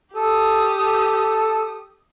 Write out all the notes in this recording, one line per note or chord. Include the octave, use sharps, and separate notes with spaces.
G4 A4 D#6
A4